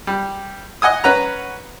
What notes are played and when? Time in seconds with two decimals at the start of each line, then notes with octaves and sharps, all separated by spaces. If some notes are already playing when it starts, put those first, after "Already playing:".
0.07 G3
0.82 D#5 F#5 G#5 D#6
1.04 C#4 B4 F#5 A#5